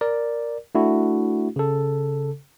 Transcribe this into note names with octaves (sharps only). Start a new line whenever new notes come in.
A#4 D5
A3 D4 E4 F#4
C#3 A4